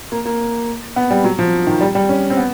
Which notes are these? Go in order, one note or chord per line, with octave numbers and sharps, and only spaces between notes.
A#3
A#3
B3
G3
F#3
F3
D#3
G3
G3
C#4
C4
B3